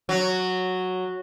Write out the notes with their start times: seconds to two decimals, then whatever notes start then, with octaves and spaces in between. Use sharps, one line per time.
0.09 F#3